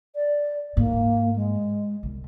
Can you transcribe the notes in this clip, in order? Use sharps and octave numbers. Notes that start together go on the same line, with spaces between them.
D5
G#2 A#3
G#3
C2